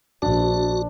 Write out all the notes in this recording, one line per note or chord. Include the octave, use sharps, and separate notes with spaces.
A#1 D4 F#4